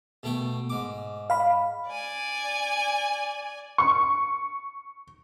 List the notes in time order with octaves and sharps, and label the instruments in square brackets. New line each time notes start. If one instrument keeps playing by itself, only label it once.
[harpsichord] B2 A3 G5
G#2 D6
[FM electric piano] F5 B5
[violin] D5 G#5
[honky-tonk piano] C#6